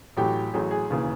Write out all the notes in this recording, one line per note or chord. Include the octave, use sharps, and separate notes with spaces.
A1 A2 F#3 G4
A1 A2 F#3 G#4
G#4
E1 D#2 C#3 E3